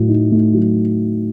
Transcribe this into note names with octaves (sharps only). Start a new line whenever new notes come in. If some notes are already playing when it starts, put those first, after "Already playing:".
Already playing: A2 F#3 A3
D#4
A3
F#3